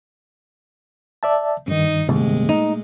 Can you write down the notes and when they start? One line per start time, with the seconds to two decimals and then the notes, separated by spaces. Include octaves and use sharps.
1.23 D5 E5 A5
1.68 G2 D#3 D#4
2.09 C2 A#2 G#3 A3
2.49 D#4